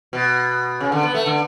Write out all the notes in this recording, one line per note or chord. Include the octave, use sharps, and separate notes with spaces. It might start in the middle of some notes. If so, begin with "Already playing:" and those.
B2
C#3
D3
B3
A3
D3